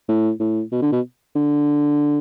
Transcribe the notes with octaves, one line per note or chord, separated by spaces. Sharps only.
A2
A2
B2
D3
B2
D3